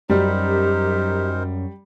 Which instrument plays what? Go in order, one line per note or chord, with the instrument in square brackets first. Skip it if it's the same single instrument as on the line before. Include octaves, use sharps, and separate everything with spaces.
[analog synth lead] F#2 [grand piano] G3 [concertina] D#4 A#4 C5 [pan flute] G4